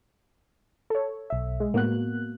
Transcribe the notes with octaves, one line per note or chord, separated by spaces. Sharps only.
A4 C#5
B1 E5
G#3
A2 A#3 B3 F#4 F#6